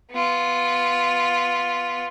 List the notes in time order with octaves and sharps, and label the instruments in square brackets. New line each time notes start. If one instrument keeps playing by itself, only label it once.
[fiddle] B3 F4